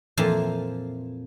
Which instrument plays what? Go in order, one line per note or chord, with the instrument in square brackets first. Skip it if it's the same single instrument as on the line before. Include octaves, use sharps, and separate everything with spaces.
[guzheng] F2 A#2 E3 F3 A5 C6